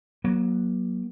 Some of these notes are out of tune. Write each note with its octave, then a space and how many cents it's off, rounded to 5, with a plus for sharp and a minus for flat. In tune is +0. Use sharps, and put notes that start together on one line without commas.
F#3 +0 A#3 +30